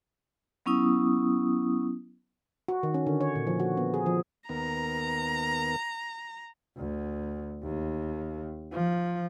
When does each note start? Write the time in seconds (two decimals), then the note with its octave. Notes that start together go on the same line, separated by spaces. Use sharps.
0.66 F#3 B3 C#4 E4 D#6
2.68 F#4
2.83 D#3
2.94 C#4
3.07 D3
3.21 C#5
3.35 A#2
3.47 F3
3.60 F#4
3.77 B3
3.94 G#4
4.06 F3
4.49 D#2 B3 A#4 A#5
6.77 D2
7.63 D#2
8.73 F3